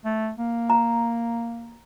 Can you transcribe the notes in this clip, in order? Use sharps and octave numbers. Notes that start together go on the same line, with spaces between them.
A3
A#3
A#5